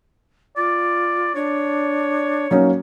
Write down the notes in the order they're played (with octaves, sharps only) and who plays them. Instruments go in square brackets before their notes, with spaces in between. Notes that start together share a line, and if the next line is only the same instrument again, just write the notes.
[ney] F4 [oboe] D5
[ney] D4 [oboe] C#5
[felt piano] F#3 A#3 C#4 [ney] D#4